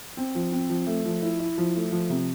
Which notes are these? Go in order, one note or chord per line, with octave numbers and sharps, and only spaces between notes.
C4
F3
C4
F3
A3
F3
E4
E4
F3
A3
F3
C3